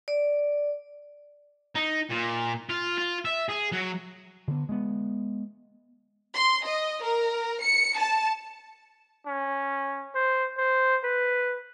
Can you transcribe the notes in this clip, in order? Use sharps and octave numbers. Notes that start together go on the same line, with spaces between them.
D5
D#4
A#2
F4
F4
E5
G#4
F#3
D3 B3
G#3 B3
C6
D#5
A#4
C#7
A5
C#4
C5
C5
B4